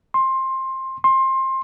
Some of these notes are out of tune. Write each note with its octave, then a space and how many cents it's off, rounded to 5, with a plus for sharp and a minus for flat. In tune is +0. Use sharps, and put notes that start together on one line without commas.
C6 +15
C6 +20